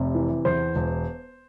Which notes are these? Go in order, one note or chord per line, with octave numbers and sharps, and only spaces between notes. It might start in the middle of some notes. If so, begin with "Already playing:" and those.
Already playing: F1 C3
E3
E2 C5
E1